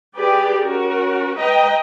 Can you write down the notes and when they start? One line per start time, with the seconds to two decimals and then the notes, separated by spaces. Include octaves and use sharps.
0.15 G4 G#4 B4 D5
0.61 C#4 F#4 A#4
1.35 B4 D#5 G5 A#5